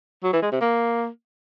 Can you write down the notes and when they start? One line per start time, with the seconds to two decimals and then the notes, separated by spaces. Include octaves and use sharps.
0.24 F#3
0.33 E3
0.42 G#3
0.52 C3
0.61 A#3